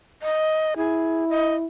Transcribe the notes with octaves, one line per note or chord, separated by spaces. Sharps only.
D#5
E4 G#4
D#5